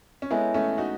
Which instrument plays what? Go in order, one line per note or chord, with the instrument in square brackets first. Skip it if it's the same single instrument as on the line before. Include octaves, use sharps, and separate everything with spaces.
[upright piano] C#4
[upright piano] G#3 B3 [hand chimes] E4 A4 C#5 E5 G#5
[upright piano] A3 C#4
D#4 F#4